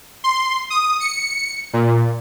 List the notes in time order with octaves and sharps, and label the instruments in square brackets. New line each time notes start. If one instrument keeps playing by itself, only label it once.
[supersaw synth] C6
D#6
C#7
A#2